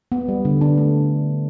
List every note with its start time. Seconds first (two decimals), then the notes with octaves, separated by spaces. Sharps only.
0.12 B3
0.28 G3
0.45 D3
0.61 D4
0.78 A3